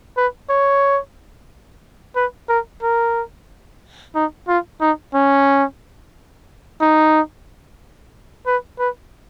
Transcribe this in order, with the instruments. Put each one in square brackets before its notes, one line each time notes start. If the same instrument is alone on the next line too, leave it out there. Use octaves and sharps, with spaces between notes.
[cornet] B4
C#5
B4
A#4
A#4
D#4
F4
D#4
C#4
D#4
B4
B4